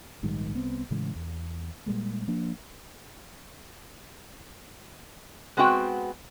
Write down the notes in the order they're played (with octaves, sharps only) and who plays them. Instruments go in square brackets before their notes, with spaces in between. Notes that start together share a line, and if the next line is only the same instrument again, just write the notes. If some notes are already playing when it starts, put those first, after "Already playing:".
[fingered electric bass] A#1 G#2 D#3 G3
C2 B3 C4
A2 C#3 E3 G#3
E2
A#2 G3 G#3 A#3
F3 A#3 D4
[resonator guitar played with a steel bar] G#3 B3 C4 F#4 G5